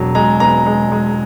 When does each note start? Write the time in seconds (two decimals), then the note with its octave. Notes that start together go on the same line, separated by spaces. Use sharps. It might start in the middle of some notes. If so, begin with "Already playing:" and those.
Already playing: E1 F#3
0.15 G#3 A#5
0.40 B3 A#5
0.66 G#3
0.92 G#3